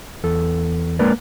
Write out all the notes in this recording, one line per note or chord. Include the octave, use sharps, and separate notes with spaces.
E2 A4
G#3 A#3 D4 A#4 B4 D5